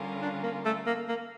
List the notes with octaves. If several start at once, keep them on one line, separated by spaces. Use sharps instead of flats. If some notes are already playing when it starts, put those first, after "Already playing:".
Already playing: D3 G3 C#4 F4 A#4
D4
A#3
A3
A#3
A#3